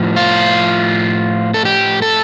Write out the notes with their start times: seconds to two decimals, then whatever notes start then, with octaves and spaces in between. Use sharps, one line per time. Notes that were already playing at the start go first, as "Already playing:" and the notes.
Already playing: A2 F3
0.16 F4
1.54 A4
1.65 G4
2.02 A4